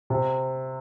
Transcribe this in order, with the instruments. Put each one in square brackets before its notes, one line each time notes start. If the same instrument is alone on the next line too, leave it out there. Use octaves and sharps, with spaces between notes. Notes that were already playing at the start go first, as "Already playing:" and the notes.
[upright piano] C3